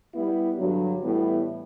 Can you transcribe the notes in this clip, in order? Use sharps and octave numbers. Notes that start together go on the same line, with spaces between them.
G3 B3 E4
G2 D3 F#3
A2 E3 G3 B3 E4